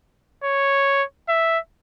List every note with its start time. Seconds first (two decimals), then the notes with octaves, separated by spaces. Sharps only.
0.44 C#5
1.29 E5